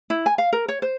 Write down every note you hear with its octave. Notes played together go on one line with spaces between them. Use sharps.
E4
G#5
F5
A#4
C#5
C5